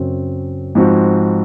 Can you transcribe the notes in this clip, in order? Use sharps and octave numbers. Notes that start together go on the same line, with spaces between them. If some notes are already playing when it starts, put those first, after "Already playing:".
Already playing: F#2 C#3 F#3 C4
G#2 F3 C4 F#4